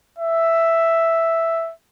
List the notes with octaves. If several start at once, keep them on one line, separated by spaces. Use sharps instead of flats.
E5